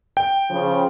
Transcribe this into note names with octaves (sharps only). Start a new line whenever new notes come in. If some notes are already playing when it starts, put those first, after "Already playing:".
G5
C#3 F3